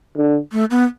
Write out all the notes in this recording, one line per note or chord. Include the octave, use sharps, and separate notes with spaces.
D3
A3
B3